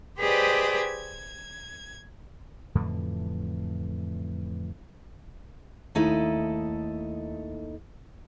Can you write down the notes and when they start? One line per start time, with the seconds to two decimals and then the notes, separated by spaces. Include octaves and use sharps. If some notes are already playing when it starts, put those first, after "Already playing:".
0.19 G4 G#4 B4 C5 D5 D#5
0.81 G#6
2.75 F2 A2 D3 E3
5.95 D#2 A3 D#4 E4 A4 D#5